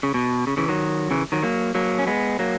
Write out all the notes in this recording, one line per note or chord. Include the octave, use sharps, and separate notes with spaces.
C#3
B2
C#3
C#3 E3
D#3 F#3
C#3 E3
D#3 F#3
F#3 A#3
F#3 A#3
C#4
G#3 B3
F#3 A#3